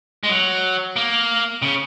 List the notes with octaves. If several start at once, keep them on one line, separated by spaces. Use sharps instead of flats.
G#3
F#3
A#3
C#3